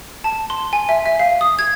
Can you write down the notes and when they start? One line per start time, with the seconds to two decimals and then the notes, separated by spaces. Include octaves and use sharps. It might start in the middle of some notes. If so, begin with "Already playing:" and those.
0.24 A5
0.50 C6
0.73 G#5
0.89 E5
1.06 E5
1.19 F5
1.41 D#6
1.59 G#6